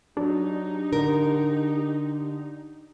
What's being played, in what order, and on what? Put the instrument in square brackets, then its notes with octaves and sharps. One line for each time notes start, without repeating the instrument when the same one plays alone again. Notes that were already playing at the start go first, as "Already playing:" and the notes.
[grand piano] F#3 [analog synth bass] D4 [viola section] D#4 G4
[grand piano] D3 [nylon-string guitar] A#4